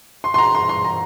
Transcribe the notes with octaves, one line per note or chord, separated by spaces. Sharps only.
C6
C6
A#5
C6
C6
A#5